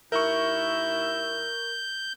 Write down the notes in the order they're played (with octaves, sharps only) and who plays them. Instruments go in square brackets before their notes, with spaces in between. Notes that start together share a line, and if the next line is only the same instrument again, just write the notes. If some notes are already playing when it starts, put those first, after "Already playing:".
[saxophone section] D#2 E4 E5 [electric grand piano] A#4 C#6 [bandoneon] G6